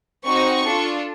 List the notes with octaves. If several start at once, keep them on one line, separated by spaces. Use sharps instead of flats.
C4 D#4 F#4 C#6
D4 F4 A4